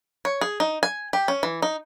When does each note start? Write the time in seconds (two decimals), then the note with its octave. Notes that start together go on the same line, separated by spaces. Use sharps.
0.25 C#5
0.41 G#4
0.60 D#4
0.83 G#5
1.13 G4
1.28 C#4
1.43 E3
1.62 D#4